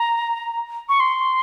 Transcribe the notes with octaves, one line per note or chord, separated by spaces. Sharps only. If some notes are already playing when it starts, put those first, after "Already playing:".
Already playing: A#5
C#6
C6